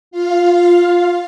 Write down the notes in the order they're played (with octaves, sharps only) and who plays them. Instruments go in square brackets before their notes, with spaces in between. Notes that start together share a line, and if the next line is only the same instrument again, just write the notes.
[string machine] F4 F5